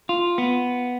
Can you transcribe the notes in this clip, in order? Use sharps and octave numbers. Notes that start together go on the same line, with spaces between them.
F4
B3